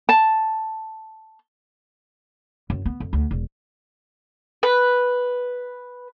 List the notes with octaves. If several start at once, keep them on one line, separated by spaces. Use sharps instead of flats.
A5
F#2
B3
F2
D2
E1
B4